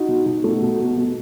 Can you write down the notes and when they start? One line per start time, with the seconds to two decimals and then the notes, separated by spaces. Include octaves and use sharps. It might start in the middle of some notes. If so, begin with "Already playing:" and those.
Already playing: D#4 F#4
0.08 B2
0.26 B2
0.44 A3
0.62 B2
0.79 B2
0.97 B2